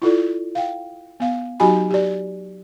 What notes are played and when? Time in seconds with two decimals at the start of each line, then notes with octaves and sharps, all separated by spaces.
0.02 E4 F4 A4 D5
0.55 F5 G5
1.20 B3 F5
1.60 F#3 D#4 F#4 G4 G#5 B5
1.90 G4 D5